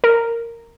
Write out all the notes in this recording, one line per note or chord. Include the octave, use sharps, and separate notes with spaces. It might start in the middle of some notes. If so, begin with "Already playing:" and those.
A#4